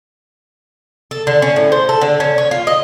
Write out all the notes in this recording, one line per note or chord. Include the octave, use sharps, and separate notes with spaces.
A4
D3
C#4
A2
C5
A4
D3
C#4
C#5
F4
D#5